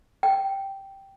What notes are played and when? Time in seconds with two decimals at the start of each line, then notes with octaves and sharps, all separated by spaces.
0.23 G5